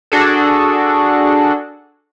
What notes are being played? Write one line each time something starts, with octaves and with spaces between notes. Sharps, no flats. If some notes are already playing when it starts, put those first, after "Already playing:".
D4 F#4 G#4 A4